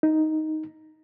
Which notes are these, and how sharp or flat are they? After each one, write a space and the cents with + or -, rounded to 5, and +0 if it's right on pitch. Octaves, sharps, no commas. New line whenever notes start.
D#4 +5